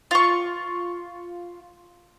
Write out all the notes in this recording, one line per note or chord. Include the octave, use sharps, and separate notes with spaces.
F4 C#6